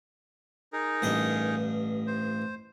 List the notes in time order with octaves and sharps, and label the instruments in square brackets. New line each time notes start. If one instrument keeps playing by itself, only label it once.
[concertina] D#4 G#4 A#4
[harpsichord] A1 G2 D#5
[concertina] C5